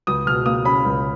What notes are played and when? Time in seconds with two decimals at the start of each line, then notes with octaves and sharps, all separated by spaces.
0.07 C#2 D#6
0.26 B2 F6
0.46 A#3 D#6
0.65 C#4 B5
0.85 C#2